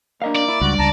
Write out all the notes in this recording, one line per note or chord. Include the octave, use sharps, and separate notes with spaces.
A#3 D4 D#5 F5
D5
E4
C#2 G2 F#4 D6
C#2 A5 A#5